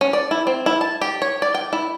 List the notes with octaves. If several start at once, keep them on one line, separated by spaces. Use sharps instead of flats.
C#4
D5
E4
C4
E4
A5
G4
C#5
D5
G5
E4